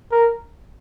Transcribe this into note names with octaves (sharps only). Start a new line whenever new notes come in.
A#4